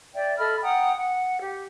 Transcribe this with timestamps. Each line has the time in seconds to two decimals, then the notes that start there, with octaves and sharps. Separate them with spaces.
0.14 D5 E5 G5
0.37 A4 D#5 B5 F6
0.62 F#5 G5 A#5 D#6
0.94 F#5
1.41 G4